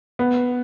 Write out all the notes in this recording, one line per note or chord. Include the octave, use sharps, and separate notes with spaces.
B3